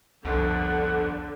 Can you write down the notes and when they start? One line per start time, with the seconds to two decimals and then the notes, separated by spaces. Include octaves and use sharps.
0.25 G1 C2 F2 D3 F#5